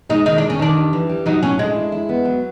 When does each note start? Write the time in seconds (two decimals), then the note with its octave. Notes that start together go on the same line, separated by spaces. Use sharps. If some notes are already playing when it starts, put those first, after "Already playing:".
0.09 G#3 D#4
0.26 D#3 D#4
0.38 D4
0.43 D#3
0.50 C#4
0.59 D#3 D4
0.76 G3
0.93 E3
1.09 G3
1.26 F#3 D#4
1.43 A2 C#4
1.59 G#3 D4
1.76 E4
1.92 E4
2.09 B3
2.25 F#3